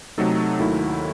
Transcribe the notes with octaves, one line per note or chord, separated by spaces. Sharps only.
C3 F#3 A3 D#4 A4
D#2 D#3 F#3 A3 E4